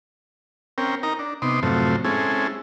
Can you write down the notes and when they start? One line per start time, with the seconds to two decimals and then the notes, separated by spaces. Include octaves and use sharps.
0.78 C4 C#4 A#4 G5
1.03 D#4 A#4 A#5
1.19 D4
1.42 C3 B3 D#4 C6 D6
1.63 F#2 A2 C3 F3 A3 C4
2.05 G#3 C4 C#4 E4 G#4 A4